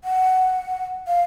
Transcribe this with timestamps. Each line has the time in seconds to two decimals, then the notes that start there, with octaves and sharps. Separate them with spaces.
0.04 F#5
1.07 F5